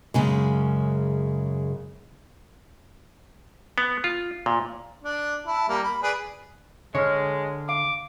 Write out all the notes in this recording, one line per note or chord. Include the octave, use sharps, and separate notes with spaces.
F#2 C#3 G#3
B3
F4
A#2
D4
E4 A5
G3 A#3
B5
G#4 B4 D5
D3 G#3 C#5 F6
F5 D6